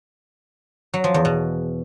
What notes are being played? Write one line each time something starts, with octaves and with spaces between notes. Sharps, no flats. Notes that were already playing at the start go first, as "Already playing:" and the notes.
F#3
F3
E2
B2